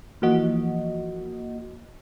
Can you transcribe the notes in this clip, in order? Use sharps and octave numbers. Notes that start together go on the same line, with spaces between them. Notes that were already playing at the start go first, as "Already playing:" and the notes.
E3 F3 A#3 F#4 D#5